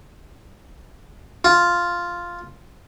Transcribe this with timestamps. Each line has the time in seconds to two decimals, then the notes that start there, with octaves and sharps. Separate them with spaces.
1.44 F4